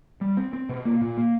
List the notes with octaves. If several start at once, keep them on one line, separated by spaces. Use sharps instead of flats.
G3
C4
C4
B2
A#3
A#2
A#3